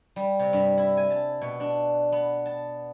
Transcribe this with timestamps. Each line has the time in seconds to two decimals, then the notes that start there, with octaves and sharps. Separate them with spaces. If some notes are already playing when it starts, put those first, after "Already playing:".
0.16 G3
0.39 C3
0.53 G2
0.78 E4
0.97 G#5
1.11 A5
1.42 B2
1.60 D4
2.12 B3
2.46 A5